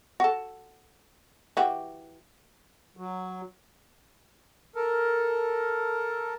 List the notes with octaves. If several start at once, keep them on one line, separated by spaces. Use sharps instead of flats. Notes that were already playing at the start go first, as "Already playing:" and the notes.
F#4 A4
E3 F#4 G4
F#3
A4 A#4